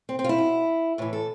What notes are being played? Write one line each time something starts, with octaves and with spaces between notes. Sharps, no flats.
C4
C4
F4
E4
B2
A2 E3 B4
A4